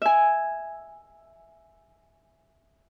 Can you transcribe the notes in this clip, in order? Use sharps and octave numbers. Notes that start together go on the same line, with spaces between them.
E5 G#5